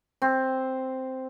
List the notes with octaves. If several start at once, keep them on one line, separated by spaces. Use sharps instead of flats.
C4